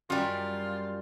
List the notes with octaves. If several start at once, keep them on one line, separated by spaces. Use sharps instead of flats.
F#2 G3 F4